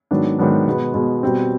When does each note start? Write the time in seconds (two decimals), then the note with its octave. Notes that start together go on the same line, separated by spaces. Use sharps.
0.11 G#2 D#3 F#3 B3 D4
0.39 G#2 D#3 F#3 B3 D4
0.67 B2 G#3 B3
0.94 B2 G#3 B3
1.23 B2 G3 C4